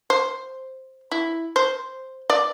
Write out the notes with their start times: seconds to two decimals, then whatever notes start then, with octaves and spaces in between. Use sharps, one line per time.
0.10 C5
1.12 E4
1.56 C5
2.30 D5